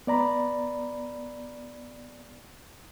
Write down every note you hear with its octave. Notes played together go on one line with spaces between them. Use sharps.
B3 D5 A#5 B5